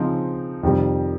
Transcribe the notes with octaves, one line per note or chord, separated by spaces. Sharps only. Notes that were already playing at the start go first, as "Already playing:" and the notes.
Already playing: C#3 F3 C4 D#4
F2 C3 D#3 G3